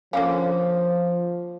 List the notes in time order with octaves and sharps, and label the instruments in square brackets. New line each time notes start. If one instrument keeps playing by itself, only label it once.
[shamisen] D3 A#3 C#4 [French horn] F3 [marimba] F5